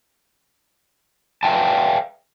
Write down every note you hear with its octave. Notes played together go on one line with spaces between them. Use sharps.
B4 E5 F5 G5 A5